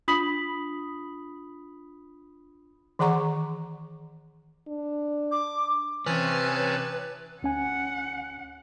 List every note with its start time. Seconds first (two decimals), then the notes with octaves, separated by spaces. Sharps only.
0.08 D4 F4 B5 D#6 B6 F#7
2.99 D#3 E3 G#4 F#5 A#5 C#6
4.68 D4
5.32 D6
6.06 C3 E3 C#4 B4 A5 D#6 G#6
7.43 D2 C#4 F#5 G#5